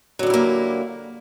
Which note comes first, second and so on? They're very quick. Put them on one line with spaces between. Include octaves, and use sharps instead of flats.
F#3 D3 G3 E4 A#3